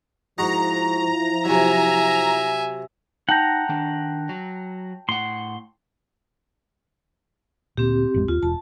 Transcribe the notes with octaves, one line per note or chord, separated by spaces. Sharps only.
G#2 F3 E4 F#4 D#5 A#5
C3 F#3 E5 G#5
D#4 F#5 G5 A5 A#5 G6
D#3 D4
F#3
A2 F#5 C6
D2 A#2 C4 G4
A1 F2 G#3
D#2 F4
E1 A5